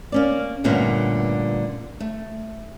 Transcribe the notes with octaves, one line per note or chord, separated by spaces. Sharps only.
A#3 C#4 D5
G2 A#2 D3 A3 B3 C#4
A3